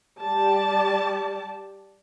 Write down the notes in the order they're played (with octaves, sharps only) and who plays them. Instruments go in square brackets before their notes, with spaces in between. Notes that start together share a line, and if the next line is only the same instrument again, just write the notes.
[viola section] G3 G4 D5 A5